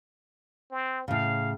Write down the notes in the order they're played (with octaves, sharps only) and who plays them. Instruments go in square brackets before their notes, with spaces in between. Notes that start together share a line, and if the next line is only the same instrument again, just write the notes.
[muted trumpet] C4
[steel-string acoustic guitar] A2 C#3 [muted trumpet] F5